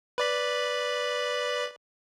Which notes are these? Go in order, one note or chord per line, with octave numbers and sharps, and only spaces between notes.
B4 D5 B5